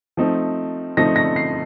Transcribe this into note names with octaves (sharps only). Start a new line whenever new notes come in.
F3 A3 C4 D#4
F3 A3 C4 D#4 A#6
A#6
C7